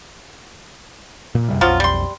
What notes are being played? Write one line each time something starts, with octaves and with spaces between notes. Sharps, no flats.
A#2
F#2 C3 G3
B1 F2 F3 F#3 F4
G3 C6